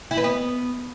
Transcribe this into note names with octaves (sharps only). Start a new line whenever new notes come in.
E4
B4
B3